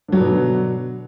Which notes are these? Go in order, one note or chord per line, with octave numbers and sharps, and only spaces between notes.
B2 D3 F#3 D4